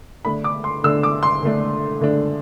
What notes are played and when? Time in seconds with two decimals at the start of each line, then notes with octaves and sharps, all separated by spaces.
0.25 D3 A3 D4 B5
0.44 D6
0.64 C6
0.84 D3 A3 D4 E6
1.03 D6
1.23 C6
1.42 D3 A3 D4
2.01 D3 A3 D4